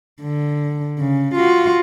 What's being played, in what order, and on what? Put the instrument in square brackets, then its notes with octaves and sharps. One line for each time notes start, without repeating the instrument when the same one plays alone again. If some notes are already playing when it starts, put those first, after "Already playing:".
[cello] D3
C#3
F4 F#4